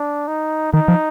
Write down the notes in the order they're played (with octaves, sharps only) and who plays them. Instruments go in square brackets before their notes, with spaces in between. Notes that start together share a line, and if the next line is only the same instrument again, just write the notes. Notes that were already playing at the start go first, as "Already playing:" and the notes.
Already playing: [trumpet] D4
D#4
[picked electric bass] D#3 [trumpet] D#4
[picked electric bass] F3